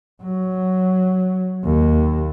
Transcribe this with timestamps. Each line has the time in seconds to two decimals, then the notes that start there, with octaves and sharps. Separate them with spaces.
0.23 F#3
1.64 D#2